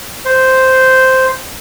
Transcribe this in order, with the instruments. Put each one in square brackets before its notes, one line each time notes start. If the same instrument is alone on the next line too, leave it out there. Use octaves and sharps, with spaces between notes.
[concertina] C5